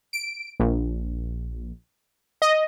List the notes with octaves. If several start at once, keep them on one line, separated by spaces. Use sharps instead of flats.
D7
A#1
D#5